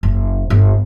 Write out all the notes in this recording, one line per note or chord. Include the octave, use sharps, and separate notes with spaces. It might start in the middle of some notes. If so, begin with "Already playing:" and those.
F#1
G1